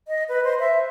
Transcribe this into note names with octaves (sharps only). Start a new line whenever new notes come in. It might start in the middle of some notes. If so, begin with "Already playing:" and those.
D#5
B4
C5
E5